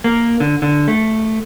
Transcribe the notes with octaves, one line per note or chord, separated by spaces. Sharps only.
A#3
D3
D3
A3